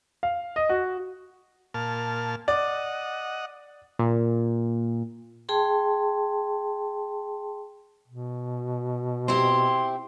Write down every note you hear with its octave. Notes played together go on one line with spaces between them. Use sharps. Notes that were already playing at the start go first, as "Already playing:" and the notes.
F5
D#5
F#4
A#2 A5 F6
D5 D#5 F#5
A#2
G#4 G5 A5 C6
B2
C4 E4 G4 C6